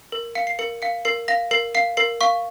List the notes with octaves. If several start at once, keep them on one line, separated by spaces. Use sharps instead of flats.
A#4
F5 C#7
C7
A#4 C#7
F5 C#7
A#4 C7
F5 A#6
A#4 C7
F5 C7
A#4 C7
F5 C#6